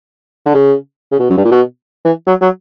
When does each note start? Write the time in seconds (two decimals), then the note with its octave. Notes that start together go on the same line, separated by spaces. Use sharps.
0.46 D3
0.54 C#3
1.12 C#3
1.19 B2
1.30 F#2
1.37 G2
1.45 A#2
1.51 B2
2.05 E3
2.27 F#3
2.41 F#3